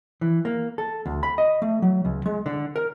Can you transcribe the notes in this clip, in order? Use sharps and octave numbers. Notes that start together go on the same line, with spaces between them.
E3
A#3
A4
D2
B5
D#5
A3
F#3
C#2
G#3
D3
A#4